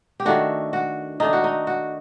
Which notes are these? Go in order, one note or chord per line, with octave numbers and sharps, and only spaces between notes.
G4
D#3 A3 D4 F#4
F#4
D#3 A3 D4 D#4
F#4
D#4
F#4